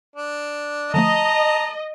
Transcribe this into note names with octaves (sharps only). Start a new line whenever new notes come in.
D4
D3 F3 A3 D#5 A5 A#5